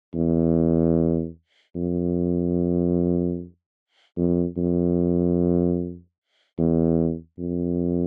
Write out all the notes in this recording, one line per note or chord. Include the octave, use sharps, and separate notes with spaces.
E2
F2
F2
F2
E2
F2